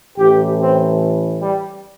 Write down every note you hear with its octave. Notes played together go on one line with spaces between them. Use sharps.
A1 A2 E3 G4
C4
G3